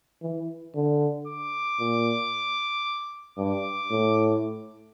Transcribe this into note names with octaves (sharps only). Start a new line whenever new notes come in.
E3
D3
D6
A#2
G2 D6
A2